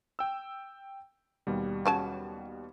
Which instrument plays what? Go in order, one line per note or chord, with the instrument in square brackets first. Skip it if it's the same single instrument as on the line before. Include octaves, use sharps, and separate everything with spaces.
[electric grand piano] G5 E6
D#2 B2 G3
[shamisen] C#3 F#3 A5